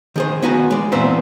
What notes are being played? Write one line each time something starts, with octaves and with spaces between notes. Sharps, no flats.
D#3 G#4 C5
B3 D#4 F#4 B4 G#5
G#3 D5
A#2 E3 B3 C4 B4 C5